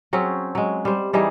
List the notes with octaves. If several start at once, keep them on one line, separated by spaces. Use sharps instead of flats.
F#3 C4 C#4 G#4
F#3 G#3
G3 C5
E3 G3 D#4 G#4